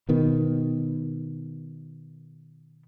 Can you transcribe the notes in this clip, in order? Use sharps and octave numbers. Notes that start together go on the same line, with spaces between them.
B2 D#3 B3